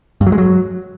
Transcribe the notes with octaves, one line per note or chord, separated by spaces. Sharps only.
G2
F#3
G#3
F#3